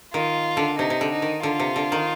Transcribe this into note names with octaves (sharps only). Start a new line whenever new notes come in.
D#3 F4
D3
C3 D#4
C3
D3
D#4
D#3
D3 F4
C3
D3
D#3